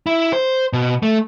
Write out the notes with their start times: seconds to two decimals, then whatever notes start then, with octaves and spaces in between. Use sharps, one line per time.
0.07 E4
0.33 C5
0.73 B2
1.03 A3